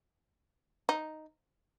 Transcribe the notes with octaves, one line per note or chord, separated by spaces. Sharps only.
D#4